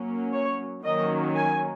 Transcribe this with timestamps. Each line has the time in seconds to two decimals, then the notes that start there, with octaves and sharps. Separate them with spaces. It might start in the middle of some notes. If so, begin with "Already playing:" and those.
Already playing: F#3 A#3 C#4
0.34 C#5
0.85 D#3 F#3 A#3 C#4 D#5
1.35 G#5